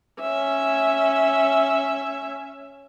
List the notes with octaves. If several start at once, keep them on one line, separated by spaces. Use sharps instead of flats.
C#4 E5